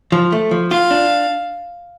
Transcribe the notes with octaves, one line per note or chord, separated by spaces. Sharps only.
F3
A3
F3
F4 F5
D4